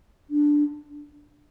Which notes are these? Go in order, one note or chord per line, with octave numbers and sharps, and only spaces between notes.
D4